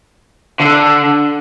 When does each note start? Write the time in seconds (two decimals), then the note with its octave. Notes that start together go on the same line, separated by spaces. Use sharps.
0.60 D3